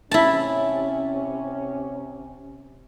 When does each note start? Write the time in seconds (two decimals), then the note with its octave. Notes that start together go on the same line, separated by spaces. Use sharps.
0.11 C3 C#4 E4 A5